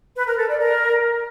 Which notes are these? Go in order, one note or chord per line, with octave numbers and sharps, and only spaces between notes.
B4
A#4
A4
D5
A#4